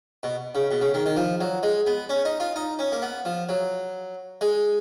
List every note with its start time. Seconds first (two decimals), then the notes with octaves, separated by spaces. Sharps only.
0.23 B2
0.55 C#3
0.71 B2
0.81 C#3
0.94 D#3
1.06 D#3
1.17 F3
1.41 F#3
1.63 G#3
1.87 B3
2.09 C#4
2.25 D#4
2.40 F4
2.56 D#4
2.79 C#4
2.92 A#3
3.02 B3
3.25 F3
3.49 F#3
4.41 G#3